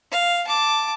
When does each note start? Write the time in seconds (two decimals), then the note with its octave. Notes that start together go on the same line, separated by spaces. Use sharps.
0.12 F5
0.47 A5 D6